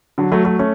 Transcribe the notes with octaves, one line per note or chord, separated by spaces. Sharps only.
D3 F#3
F#3 A3
F#3 A3
A3 C#4